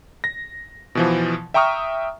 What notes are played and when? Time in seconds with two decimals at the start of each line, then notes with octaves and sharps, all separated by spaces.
0.24 A#6
0.95 B2 E3 F3
1.54 E5 G5 A#5 C#6 D#6 F6